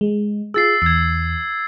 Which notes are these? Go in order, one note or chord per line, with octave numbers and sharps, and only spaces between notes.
G#3
F4 G#4 E6 A6 C7
E2 E6 G#6